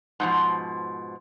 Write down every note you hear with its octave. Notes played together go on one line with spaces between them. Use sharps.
G#2 B2 F3